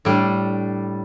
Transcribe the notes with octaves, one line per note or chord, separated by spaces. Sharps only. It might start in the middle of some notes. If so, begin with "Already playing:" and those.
A2 G3 D4